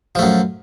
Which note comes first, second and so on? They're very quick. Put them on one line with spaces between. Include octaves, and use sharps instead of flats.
F3 A3 F#2